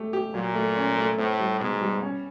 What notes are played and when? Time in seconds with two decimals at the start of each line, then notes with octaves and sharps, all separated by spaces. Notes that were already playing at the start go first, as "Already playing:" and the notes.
Already playing: A3 G4
0.13 G4
0.34 A#2 F#3
0.54 A3
0.76 C#4
0.97 A3
1.18 A2 C4
1.40 G3
1.60 G#2 B2
1.81 G3
2.03 C#4